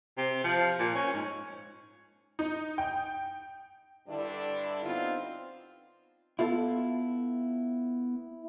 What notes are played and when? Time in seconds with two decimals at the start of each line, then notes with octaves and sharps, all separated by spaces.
0.17 C3
0.44 F3
0.79 A#2
0.95 C#4
1.14 G#2
2.39 D#4
2.78 G5
4.09 G2 D3 G3 D4 E4
4.84 B3 C4 D#4 F4
6.39 B3 E4 F4 A4